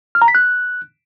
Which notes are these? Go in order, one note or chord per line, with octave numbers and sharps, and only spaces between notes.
F6
A#5
B6
F#6